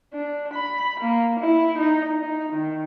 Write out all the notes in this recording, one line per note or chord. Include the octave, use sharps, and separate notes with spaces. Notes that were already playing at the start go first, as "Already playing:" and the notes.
D4
B5
A#3
E4
D#4
D#4
D#3